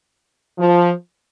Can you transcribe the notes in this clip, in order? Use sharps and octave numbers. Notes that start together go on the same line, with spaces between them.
F3